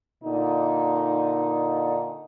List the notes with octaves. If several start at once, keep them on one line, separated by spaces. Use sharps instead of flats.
A#2 D3 D#4